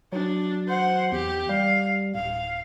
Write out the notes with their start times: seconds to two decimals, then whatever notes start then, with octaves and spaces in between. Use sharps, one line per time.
0.12 F#3 D4
0.68 C5 F#5
1.12 E2 G4
1.49 G3 F5
2.15 D1 F5